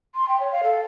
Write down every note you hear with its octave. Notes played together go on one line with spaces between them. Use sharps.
C6
G5
C#5
F5
A4